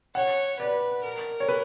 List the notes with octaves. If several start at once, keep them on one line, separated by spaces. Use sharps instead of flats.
C#5 F#5
B4 D5
A#4
C#5
B4